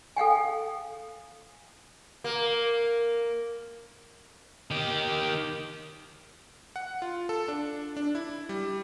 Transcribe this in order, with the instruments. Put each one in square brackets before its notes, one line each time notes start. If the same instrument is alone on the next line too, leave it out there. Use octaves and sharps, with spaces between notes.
[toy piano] A4 F5 G5 G#5
[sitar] A#3
[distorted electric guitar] D#3 G4
[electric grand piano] F#5
F4
A4
D4
D4
E4
G3